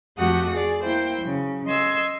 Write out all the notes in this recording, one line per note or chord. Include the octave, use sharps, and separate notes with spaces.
F2 A3 F#4 G4 F#5 D#6
G#4 D5
A#3 E4 C5 G5
C#3 F#3
D#5 C6 E6 G#6